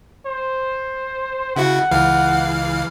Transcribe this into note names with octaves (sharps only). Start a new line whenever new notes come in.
C5
C#3 E4 F#4 F#5
C#2 E3 F5